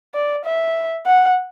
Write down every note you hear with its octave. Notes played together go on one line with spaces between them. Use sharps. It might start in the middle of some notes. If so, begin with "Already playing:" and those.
D5
E5
F#5